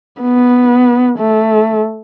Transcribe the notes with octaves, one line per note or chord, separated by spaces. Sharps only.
B3
A3